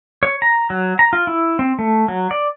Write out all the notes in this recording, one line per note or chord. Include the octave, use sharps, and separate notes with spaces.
C#5
A#5
F#3
A#5
F4
E4
C4
A3
F#3
D5